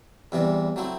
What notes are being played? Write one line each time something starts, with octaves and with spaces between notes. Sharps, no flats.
E2 C3 E3 G3
F#3 A3 C4 E4